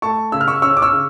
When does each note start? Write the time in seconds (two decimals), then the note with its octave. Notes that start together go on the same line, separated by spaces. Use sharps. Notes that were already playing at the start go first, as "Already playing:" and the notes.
0.02 A3 A5 C#6
0.32 C#3 E6
0.41 F6
0.48 C#6 E6
0.62 C#4 C#6 E6
0.77 D6
0.82 C#6 E6
0.93 C#3